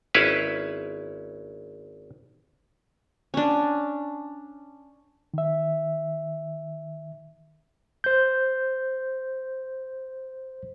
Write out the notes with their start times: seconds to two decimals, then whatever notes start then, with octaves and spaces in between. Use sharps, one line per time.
0.14 G#1 C#4 E4 B4 F5
3.34 C#4 D4
5.34 D#3 E5
8.04 C5 G6